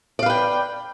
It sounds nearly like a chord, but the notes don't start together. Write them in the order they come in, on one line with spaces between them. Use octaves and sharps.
D5 F5 B4 G5